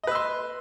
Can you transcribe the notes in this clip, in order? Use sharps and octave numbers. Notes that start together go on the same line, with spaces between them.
B4 D#5 C6 E6